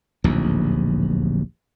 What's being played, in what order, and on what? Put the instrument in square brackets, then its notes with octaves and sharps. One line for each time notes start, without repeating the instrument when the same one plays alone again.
[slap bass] D1 A#1 D#2